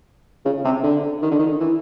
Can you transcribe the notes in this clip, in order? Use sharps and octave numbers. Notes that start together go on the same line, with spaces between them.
C#3
C3
D3
D#3
D3
D#3
E3